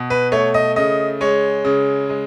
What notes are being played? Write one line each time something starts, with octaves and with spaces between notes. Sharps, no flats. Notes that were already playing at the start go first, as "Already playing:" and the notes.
Already playing: B2
B4
A3 C#5
D#5
C#3 D#5
G#3 C#5
C#3
G#3